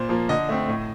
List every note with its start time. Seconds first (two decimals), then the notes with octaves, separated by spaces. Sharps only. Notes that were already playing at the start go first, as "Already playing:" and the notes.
Already playing: A#2 C5
0.09 F3 A#3
0.29 D3 D#5
0.49 A3 C4
0.68 A2